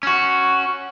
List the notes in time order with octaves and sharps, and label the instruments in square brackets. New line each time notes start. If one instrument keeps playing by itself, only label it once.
[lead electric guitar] C#4 F#4